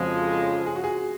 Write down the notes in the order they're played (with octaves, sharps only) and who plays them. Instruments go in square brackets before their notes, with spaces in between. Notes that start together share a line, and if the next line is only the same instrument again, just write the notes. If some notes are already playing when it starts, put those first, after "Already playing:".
Already playing: [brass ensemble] F2 C#3 F3 G#3 [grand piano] F#4
[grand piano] G#4
F#4
G#4